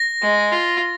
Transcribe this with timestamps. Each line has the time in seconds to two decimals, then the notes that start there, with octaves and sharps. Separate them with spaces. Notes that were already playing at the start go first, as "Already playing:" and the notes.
Already playing: A#6
0.22 G#3
0.52 F4